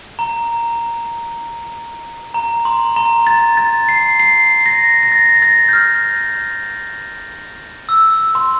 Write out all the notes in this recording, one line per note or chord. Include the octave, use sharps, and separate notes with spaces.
A#5
A#5
C6
A#5
A6
A6
C7
C7
A#6
A#6
A6
A#6
A6
G6
F6
E6
C6